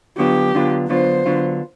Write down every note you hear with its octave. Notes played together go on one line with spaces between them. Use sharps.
D3 F#3 B3 D4 F4 G4
D3 F#3 B3 D4 F4
D3 F#3 B3 D4 F4 C5
D3 F#3 B3 D4 F4